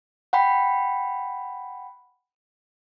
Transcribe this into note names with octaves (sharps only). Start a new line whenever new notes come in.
F#5 G5 B5